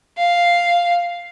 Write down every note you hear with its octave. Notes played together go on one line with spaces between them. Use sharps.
F5